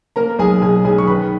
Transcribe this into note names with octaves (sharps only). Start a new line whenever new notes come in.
A#3 A#4 A#5
B1 G#4 G#5
B2 G#4 G#5
B1 G#4 G#5
C#6
D#3 B4 B5